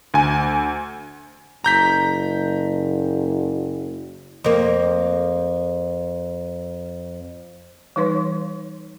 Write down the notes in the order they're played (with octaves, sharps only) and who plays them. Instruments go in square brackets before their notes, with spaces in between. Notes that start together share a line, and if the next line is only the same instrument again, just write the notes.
[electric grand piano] D2 G#5
[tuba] F#1 [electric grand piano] A#5 G6 B6
[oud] F2 A#3
[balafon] E3 G3 D#4 B4 C#5 C6